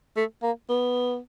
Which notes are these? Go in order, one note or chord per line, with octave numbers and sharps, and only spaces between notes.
A3
A#3
B3